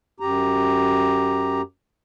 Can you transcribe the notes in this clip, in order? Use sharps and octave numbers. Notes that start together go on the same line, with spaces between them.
F#2 G4 A#5